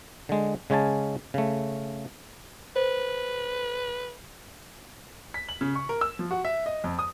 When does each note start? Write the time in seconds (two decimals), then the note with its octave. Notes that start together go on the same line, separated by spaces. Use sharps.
0.29 D3 G#3
0.70 C#3 G#3 C#4 G#5 A5
1.34 C#3 A3
2.76 B4 C5
5.34 B6
5.49 F#7
5.61 C#3
5.75 C#6
5.89 A#4
6.01 E6
6.19 F3
6.31 F#4
6.45 E5
6.66 D#5
6.84 F2
6.99 D#6